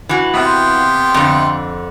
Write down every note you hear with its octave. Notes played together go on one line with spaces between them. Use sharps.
E3 F#4
C3 B3 F4 G4 G5
F2 D3